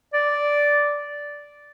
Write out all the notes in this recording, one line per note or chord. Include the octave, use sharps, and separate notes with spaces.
D5